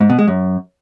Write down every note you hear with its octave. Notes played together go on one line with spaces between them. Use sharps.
G#2
B2
G#3
F#2